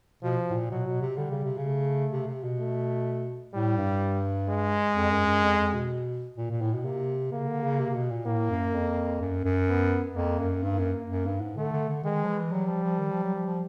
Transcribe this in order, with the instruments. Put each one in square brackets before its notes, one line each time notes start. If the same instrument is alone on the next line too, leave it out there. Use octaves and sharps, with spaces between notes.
[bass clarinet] B2 [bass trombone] F3
[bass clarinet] A2
A#2
[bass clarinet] B2 [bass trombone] F#3
[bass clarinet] B2
C3
[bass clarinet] D3 [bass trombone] G3
[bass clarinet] C#3
C3
C#3
[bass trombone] A3
[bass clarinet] C3
C3
B2
[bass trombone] A3
[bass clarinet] A2 [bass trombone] G3
[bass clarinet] G2
[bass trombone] G#3
[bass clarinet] F2
F#2
F#2
F2
F2
B2
[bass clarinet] A#2 [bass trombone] A#3
[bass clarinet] A#2
A2
B2
[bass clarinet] C3 [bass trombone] A#3
[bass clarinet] C#3 [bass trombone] A#3
[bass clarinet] D3
C#3
C3
C3
B2
A#2
[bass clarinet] A2 [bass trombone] A#3
[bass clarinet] F#2
F2
F#2
F#2
[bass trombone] B3
[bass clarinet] F2 [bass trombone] A#3
[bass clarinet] F#2
[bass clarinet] G2 [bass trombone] A#3
[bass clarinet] F#2
F#2
G2
G#2
[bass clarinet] D3 [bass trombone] A3
[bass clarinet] D3
D3
[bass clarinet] D#3 [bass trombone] G#3
[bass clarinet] F3
E3
[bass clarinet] F#3 [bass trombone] G3
[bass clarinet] F3
F3
D#3
F3
F#3
F3
F3